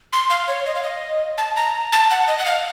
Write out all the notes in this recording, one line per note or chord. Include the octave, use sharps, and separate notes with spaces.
C6
F5
C#5
D#5
F5
D#5
A5
A#5
A5
F#5
D#5
F#5
F5